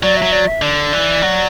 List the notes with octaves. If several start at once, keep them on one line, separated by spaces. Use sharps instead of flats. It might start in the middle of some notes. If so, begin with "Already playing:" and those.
F#3 D5
E5
F#3
D5
E5
D3 D5
E3
F#3